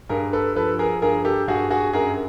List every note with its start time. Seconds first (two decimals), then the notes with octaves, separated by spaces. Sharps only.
0.09 G2 G#4 A#4
0.33 A4 B4
0.55 F3 A4 B4
0.79 G#4 A#4
1.02 G2 G#4 A#4
1.25 G4 A4
1.48 G2 F#4 G#4
1.70 F#4 G#4
1.93 F#2 G#4 A#4